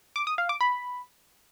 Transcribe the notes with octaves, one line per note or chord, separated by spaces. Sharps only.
D6
D#6
F5
D6
B5